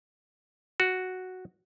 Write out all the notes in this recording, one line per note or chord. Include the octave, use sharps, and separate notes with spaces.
F#4